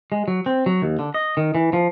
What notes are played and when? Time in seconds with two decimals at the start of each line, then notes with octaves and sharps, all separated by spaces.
0.12 G#3
0.28 F#3
0.46 C4
0.66 F#3
0.82 D#2
0.99 D3
1.14 D#5
1.37 D#3
1.55 E3
1.73 F3